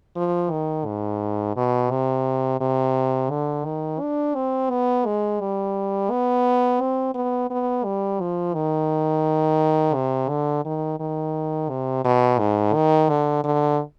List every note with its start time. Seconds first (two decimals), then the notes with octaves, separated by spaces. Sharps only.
0.16 F3
0.51 D#3
0.86 G#2
1.57 B2
1.91 C3
2.61 C3
3.30 D3
3.65 D#3
4.01 D4
4.35 C4
4.70 B3
5.06 G#3
5.41 G3
6.11 B3
6.81 C4
7.15 B3
7.50 B3
7.85 G3
8.21 F3
8.55 D#3
9.95 C3
10.29 D3
10.65 D#3
11.00 D#3
11.69 C3
12.05 B2
12.39 G#2
12.74 D#3
13.09 D3
13.44 D3